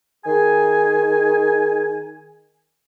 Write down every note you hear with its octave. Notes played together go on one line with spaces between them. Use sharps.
D#3 G#4 G#5